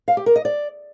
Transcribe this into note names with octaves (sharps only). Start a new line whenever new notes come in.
F5
G4
A#4
D#5
D5